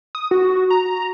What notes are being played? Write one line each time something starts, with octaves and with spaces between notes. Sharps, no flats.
D#6
F#4
A#5